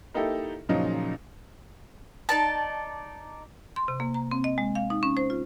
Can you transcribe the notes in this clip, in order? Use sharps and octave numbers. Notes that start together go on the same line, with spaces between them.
A#3 D#4 E4 G4 A4
A#2 C#3 F3 F#3 D#4
D#4 D5 A5
C6
C3
A#3
A#5
C4
D#5
G#3
F5
D#4
C#4
C5
F4